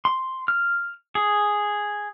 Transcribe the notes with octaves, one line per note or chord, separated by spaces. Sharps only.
C6
F6
G#4